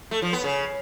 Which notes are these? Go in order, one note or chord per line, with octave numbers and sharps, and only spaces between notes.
A3
F3
B3
C#3